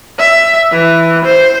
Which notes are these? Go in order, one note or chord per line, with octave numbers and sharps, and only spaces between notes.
E5
E3
C5